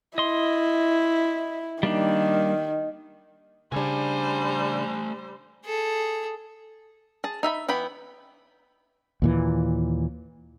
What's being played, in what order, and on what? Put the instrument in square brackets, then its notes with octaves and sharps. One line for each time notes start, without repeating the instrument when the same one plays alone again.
[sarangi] E4 [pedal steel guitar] D#5 C6
[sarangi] D#3 [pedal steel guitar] G3 A#3 D4
[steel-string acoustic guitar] C#3 D4 [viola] G3 C5 [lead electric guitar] A3 G#5
[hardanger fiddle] G#4 A4
[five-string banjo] G#4 A5
D#4 E5 G#5 B5
E3 B3 G5 B5
[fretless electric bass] D#2 A#2 E3